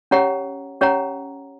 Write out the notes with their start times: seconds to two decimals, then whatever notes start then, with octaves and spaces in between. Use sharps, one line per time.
0.11 C#4 G4 C#5 F#5 A#5
0.81 C#4 G4 C#5 F#5 A#5